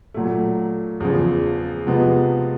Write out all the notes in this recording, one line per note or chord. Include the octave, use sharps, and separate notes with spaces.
A#2 F#3 A3
E2 C#3 F3
C3 F3 G#3 B3